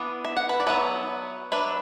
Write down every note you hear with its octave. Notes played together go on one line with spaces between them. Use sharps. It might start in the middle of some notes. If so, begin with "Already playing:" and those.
Already playing: E3 B3 D4
E5
F#5
B4 E5
D5
F#3 B3 D4 B4 E5
F#3 D4 B4 E5